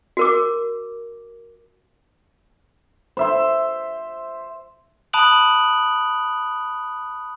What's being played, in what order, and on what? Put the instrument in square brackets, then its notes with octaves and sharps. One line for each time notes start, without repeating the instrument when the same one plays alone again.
[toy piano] F#4 A#4 D6
[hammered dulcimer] C5 E5 C6
[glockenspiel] A5 B5 D#6 F#6 D7 F#7